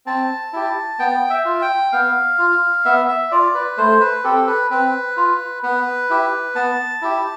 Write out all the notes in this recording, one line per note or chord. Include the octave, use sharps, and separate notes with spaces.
C4 A5
E4 G4
B3 G5
E5
F4
G5
B3 F5
F4
B3 E5
E5
F4 D5
B4
A3 C5
B4
C4 G4 A4
B4
C4 B4
F4
B3 B4
E4 G4
B3 A5
E4 G4